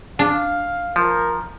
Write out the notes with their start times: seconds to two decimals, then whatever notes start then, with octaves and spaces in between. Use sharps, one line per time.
0.19 D4 F5
0.96 F3 A#4